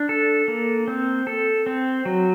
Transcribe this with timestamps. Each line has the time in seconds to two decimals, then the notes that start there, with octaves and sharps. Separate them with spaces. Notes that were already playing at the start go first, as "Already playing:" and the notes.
Already playing: D4
0.09 A4
0.48 A#3
0.88 C4
1.27 A4
1.66 C4
2.05 F#3